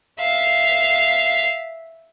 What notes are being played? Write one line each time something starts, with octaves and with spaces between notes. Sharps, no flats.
E5 F5